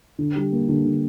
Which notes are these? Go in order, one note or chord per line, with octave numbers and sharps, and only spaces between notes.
D3
G3
A#3
D3
D3